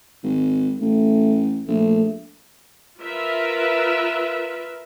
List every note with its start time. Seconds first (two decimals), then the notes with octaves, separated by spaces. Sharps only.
0.23 G#1
0.81 A1 A3
1.68 A#1 A3
3.00 F4 A#4 B4 E5